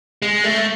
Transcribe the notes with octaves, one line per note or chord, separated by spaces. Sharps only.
G#3
A3